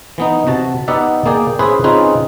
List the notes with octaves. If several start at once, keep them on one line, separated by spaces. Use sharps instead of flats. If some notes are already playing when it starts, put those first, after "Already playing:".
E3 B3 D#4
C3 F#4 A5
B3 D#4 G4 D5 E5 F#5
A#3 G#4 D5 G5
C#4 E4 G#4 B4 C5
C4 C#4 D#4 F4 G#4 B4